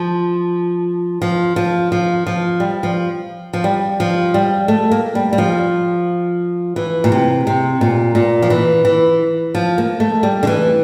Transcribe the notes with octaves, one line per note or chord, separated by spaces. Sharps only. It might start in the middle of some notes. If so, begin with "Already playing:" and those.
Already playing: F3
F3
F3
F3
F3
G3
F3
F3
G3
F3
G3
A3
A#3
G3
G3
F3
E3
A#2
C3
C3
A#2
A#2
F3
E3
E3
F3
A#3
A3
G3
D3
E3